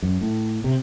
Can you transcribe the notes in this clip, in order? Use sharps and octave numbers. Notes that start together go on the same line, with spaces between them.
F#2
A2
C3